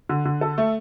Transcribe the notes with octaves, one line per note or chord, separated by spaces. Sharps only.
D3
D3
A4
A3